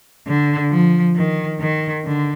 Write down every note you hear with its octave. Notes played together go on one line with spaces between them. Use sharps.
D3
F3
D#3
D#3
D3